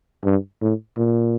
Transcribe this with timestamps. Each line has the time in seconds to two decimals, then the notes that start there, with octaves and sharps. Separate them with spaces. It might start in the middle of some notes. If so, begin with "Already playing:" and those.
0.25 G2
0.62 A2
0.97 A#2